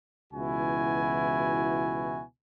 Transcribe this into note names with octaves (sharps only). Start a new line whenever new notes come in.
C#2 B2 E3 E4 F#4 G#5